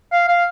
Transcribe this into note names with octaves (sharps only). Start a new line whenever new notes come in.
F5
F5